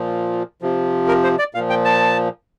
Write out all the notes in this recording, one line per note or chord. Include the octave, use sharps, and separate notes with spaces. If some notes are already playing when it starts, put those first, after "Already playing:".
Already playing: A#2 F3
C3 F3
A#4
C5
D5
A#2 F3 F5
G5
A5